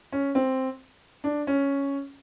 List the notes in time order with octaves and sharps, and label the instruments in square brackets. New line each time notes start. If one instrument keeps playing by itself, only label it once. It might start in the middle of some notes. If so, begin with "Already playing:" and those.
[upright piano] C#4
C4
D4
C#4